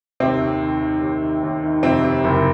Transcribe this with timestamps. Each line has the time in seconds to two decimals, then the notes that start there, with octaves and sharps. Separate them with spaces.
0.20 D#2 C3 C4
0.41 D#2
0.62 D#3
0.82 D#3
1.01 D#2
1.22 D#3
1.43 D#2
1.63 D#3
1.83 F2 C3 C4
2.04 C3
2.24 F#1